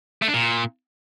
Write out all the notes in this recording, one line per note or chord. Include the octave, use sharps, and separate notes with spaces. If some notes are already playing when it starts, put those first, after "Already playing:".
A3
D4
A#2